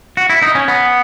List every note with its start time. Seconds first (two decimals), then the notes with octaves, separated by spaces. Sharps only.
0.17 F#4
0.30 E4
0.42 D#4
0.55 C#4
0.68 B3